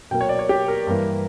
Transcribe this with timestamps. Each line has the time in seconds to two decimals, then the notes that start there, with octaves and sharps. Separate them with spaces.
0.11 B2 F#3 A#3 G5
0.21 C#5
0.29 D5
0.39 C#5
0.49 G4
0.68 A#4
0.87 G2 E3 A#3